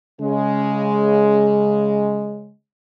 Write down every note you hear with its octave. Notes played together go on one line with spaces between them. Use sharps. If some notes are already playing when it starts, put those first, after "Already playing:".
C#3 G#3